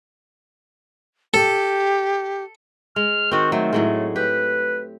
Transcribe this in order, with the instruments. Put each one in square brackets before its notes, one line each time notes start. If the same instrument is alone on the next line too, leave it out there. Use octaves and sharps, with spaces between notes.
[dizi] G4 [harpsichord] A4
[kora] G#3 [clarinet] F6
[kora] D#3 C4 [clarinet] F#4
[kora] F#3 [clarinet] A3
[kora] A2 F#3 G#3
[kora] G4 [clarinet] B4